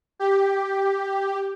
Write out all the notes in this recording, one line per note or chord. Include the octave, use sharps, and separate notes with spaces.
G4